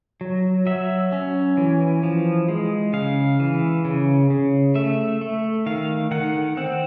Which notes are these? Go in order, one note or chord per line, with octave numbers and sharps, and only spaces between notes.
F#3
F#3 E5
C#4
E3
F3
G#3
C#3 F5
E3
C#3
C#3
A3 E5
A3
D#3 F5
D#3 F#5
C4 F#5